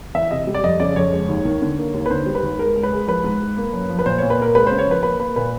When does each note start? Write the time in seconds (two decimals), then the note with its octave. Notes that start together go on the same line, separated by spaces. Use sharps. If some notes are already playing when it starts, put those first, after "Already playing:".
0.14 E3 E5
0.31 C3 D#5
0.47 G3
0.54 D5
0.63 F2 D#5
0.80 C#3 D5
0.96 F2 C#5
1.12 G#3
1.29 D#2
1.45 D#3
1.62 D3
1.78 A#3
1.94 D#2
2.06 B4
2.10 D3 C5
2.26 G3
2.35 B4
2.43 D#2
2.59 G#3 A#4
2.75 C#2
2.83 B4
2.92 G#3
3.07 F3 B4
3.24 G#2
3.41 G#2
3.57 A#3
3.73 F#2
3.89 F3
3.99 B4
4.05 A#2 C5
4.18 A#2 C#5
4.30 B4
4.38 A#3 A#4
4.55 G#3 B4
4.67 C#3 C5
4.79 C#5
4.87 F3 B4
5.03 A#3 B4
5.20 A#3 B4
5.36 A#2 B4